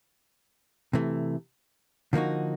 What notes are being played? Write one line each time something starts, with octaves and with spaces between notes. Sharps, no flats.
C3 E3 A3
D3 F3 A#3 D#4 F#4